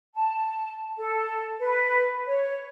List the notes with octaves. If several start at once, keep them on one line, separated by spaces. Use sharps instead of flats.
A5
A4
B4
C#5